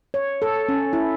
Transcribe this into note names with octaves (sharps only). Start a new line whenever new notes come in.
C#5
A4
C#4
E4